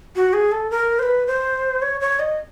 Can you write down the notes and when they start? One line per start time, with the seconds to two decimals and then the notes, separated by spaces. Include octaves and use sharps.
0.16 F#4
0.33 G#4
0.52 A4
0.70 A#4
0.99 C5
1.03 B4
1.27 C5
1.82 C#5
2.01 C#5
2.19 D#5